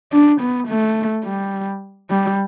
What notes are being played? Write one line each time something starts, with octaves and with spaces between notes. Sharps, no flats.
D4
B3
A3
G3
G3